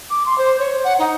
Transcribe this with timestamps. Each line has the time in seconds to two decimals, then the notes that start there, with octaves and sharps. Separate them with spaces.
0.10 D6
0.26 C6
0.38 C5
0.59 C#5
0.84 F#5
0.99 D#4